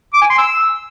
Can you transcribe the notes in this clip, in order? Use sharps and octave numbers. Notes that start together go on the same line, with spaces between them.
D6
G#5
C6
E6